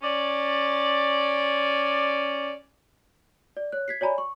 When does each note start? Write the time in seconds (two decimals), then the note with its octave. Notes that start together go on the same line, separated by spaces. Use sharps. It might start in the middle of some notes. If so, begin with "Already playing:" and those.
0.03 C#4 D5
3.57 D5
3.72 C#5 F#6
3.88 G#6 B6 C7
4.01 C#5 D5 G#5 A#5 B5
4.18 C#6